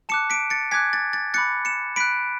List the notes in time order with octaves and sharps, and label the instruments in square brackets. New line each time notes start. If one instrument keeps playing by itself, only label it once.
[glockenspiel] A5 D6 F#6 C#7 E7
B6 D7
A6 C#7
G#5 D6 F#6 G#6 B6
A6
A6
B5 D6 F#6 A6 C#7
C#7 E7
B5 F#6 B6 D7